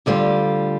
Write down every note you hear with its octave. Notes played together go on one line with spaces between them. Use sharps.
D2 D3 G3 F4